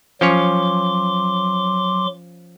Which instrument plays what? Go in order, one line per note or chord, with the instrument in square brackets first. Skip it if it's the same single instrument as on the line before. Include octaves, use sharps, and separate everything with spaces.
[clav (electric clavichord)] F3 C#4 C#5 [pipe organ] F#3 C6 D6